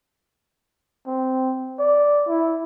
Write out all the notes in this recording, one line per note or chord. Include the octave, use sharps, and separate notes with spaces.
C4
D5
E4